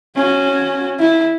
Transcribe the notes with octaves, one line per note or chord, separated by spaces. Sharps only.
C#4 F#4
E4